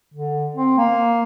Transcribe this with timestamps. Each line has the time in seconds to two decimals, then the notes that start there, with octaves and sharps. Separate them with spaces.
0.14 D3
0.57 C4
0.78 A#3